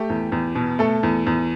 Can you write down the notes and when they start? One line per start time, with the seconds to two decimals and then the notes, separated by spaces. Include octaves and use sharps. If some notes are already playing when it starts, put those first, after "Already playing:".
Already playing: A3 G4
0.10 E2
0.32 E2
0.55 B2
0.79 A3 A4
1.03 E2
1.27 E2